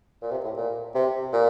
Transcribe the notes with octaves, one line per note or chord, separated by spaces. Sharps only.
A#2
C3
A2
A#2
C3
A#2